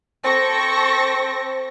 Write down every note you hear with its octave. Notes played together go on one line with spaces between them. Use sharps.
C4 A4 C#6 A#6